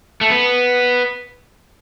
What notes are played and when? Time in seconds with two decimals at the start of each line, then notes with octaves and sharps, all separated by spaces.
0.21 A3
0.30 B3